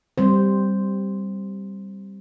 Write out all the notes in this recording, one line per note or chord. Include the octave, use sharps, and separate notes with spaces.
G3 C4 C5